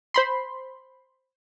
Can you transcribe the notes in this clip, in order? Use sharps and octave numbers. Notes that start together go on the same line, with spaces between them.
C5 B5 C6